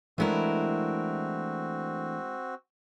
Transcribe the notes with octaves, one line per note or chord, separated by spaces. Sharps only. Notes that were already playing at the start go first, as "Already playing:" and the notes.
E3 G#3 A3 C4 D4 E4 F#4 A#4